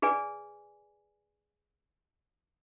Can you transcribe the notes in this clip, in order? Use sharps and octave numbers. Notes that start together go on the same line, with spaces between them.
G#4 B4 D5 G#5